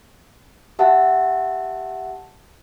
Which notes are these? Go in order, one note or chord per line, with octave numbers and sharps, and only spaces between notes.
G4 E5 F#5 A5